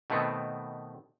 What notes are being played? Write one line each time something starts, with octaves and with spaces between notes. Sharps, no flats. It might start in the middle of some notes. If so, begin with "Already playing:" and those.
B2 D#3 A3 B3 C4